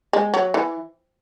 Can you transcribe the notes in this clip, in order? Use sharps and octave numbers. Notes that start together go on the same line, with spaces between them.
G#3
F#3
E3